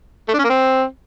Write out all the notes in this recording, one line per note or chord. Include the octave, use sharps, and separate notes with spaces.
A3
D4
C#4
A#3
C4